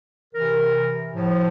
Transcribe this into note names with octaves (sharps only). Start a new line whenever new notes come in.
C3 E3 A#4
A2 F3